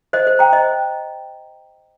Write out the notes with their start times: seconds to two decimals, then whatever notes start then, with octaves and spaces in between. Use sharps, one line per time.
0.13 C5 D#5
0.27 C5
0.39 G5 A#5
0.52 C5 D#5